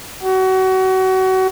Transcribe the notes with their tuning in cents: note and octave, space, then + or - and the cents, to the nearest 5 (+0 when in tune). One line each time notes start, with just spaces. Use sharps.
F#4 +30